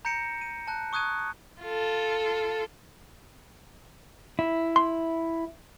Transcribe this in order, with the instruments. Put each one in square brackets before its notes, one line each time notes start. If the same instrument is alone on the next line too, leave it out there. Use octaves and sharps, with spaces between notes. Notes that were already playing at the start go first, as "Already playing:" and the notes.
[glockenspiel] A#5 G6 A#6 C#7 D7 E7
D#7
A5 F#6
C#6 D#6 F#6 G#6 D#7
[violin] F4 A4
[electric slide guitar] E4
[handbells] C6